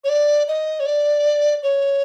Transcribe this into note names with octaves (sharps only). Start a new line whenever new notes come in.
C#5
D5
D#5
C#5
D5
C#5